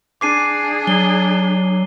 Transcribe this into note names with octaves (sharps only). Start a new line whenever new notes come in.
D4 G#4 D6 C7 D#7
F#3 G7